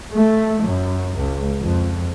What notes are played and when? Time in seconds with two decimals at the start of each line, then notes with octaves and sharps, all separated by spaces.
0.12 A3
0.61 F#2
1.15 C#2
1.61 F2